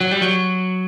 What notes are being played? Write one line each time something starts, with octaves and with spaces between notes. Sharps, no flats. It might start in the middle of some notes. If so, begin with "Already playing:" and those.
F#3
G3
F#3